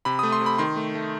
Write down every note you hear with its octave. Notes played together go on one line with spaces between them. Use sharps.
C3 B5
D#6
A3
C6
C3 B5
D#3 C6
A3
A3